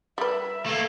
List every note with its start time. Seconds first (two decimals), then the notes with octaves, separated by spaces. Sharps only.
0.18 G3 B4 E5
0.66 A3 A#3